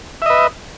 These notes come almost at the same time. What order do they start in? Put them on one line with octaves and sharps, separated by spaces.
E5 D#5 B4